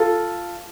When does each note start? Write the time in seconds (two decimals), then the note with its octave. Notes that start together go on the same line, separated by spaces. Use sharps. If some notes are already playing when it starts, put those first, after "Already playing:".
Already playing: F4 A4